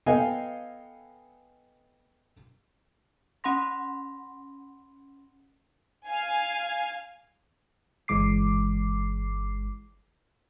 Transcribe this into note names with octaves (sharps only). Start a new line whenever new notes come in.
B3 A4 D#5 F5 G5 G#5
C#4 F#5 B5 C6 A#6
F5 G#5
G1 E3 G#3 D6 C7